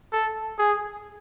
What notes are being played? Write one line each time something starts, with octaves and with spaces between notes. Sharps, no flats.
A4
G#4